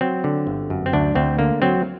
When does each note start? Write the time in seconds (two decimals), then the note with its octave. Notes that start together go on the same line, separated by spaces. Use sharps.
0.01 F#3 C4
0.24 D3
0.47 G1
0.70 F#2
0.86 C4
0.93 D2 D4
1.15 D2 C4
1.39 D3 A#3
1.62 F#3 C4